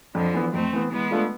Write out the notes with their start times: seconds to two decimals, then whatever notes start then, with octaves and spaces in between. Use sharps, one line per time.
0.15 F2 D3 F3
0.34 E3 B3
0.54 F2 A3 C4
0.73 E3 B3
0.92 E3 G#3 B3
1.11 A3 D4 F4 A4